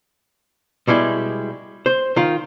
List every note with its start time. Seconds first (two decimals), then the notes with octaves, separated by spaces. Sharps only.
0.87 B2 G3 G#3 E4
1.86 C5
2.16 D#3 F4